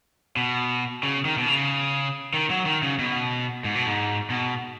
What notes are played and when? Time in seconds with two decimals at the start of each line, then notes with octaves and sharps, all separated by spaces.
0.37 B2
1.03 C#3
1.25 D#3
1.38 B2
1.46 C#3
2.34 D#3
2.50 F#3
2.66 D#3
2.83 C#3
2.99 B2
3.64 G#2
3.75 B2
3.86 G#2
4.30 B2